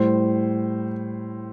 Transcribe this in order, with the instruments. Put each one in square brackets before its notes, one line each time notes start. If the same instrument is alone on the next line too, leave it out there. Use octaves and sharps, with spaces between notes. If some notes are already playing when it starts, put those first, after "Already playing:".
Already playing: [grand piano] A2 G3 C5